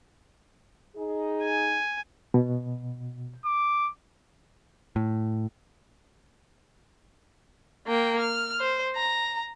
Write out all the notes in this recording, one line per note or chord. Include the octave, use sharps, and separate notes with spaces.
D#4 G#4
G#5
B2
D6
A2
A#3 G5
F6
C5
A#5